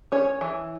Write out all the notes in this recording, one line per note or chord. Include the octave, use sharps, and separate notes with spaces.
C#4 C#5
E3